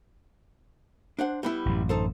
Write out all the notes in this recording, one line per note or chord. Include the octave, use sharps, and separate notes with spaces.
D4 C5 F#5
G3 B3 E4
A1 F#2
D#4 A4 C5